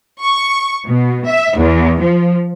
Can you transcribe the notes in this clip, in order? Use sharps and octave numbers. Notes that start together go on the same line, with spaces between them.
C#6
B2
E5
E2
F3